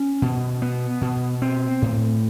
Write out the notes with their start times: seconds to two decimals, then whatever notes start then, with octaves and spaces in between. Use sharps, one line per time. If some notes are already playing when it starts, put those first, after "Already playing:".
Already playing: C#4
0.22 B2
0.62 B3
1.01 B2
1.42 C4
1.82 A2